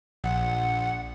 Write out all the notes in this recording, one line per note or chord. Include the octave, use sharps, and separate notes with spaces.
A#1 F#5